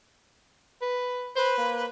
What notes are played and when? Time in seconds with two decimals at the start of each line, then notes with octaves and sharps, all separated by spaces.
0.82 B4
1.36 B4 C5
1.57 A#3